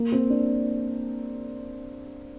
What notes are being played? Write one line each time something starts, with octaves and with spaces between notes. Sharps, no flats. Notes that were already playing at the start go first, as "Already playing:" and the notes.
Already playing: A#3
C4
D4